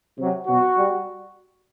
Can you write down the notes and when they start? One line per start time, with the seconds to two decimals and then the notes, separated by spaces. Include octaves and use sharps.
0.18 C3 F#3
0.47 B2 F#3 F#4
0.76 G3